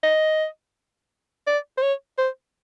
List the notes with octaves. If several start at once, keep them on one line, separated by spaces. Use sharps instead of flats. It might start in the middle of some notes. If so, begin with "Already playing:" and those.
D#5
D5
C5
C#5
C5